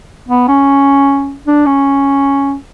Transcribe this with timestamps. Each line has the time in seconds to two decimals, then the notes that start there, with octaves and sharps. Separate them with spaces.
0.28 B3
0.48 C#4
1.47 D4
1.66 C#4